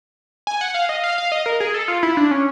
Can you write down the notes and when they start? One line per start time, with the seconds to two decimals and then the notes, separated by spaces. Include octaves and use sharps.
0.47 G#5
0.61 F#5
0.75 F5
0.89 D#5
1.04 F5
1.18 F5
1.32 D#5
1.46 A#4
1.60 G#4
1.74 A4
1.88 F4
2.03 E4
2.17 D4
2.31 C#4